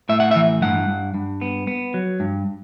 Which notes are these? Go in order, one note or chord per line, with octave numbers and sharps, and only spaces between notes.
A2 E5
F#5
E5
E3
G2 F#5
G2
G2
B3
B3
F#3
G2